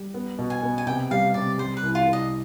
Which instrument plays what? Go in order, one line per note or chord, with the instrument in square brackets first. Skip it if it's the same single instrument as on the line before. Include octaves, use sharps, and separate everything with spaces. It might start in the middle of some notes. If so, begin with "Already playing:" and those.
Already playing: [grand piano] G3
B3
B2
[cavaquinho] G#5
[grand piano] B3
[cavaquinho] G#5
[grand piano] C3 [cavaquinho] G5
[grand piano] G3 [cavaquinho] F5
[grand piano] C3 [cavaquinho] D5
[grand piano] G3 [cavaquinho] C5
[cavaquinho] B4
[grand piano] C2
[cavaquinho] F4
[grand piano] C2
[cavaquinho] D#5